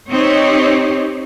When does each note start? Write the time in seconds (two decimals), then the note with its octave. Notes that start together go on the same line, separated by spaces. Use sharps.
0.12 C4 D#4 G4 C#5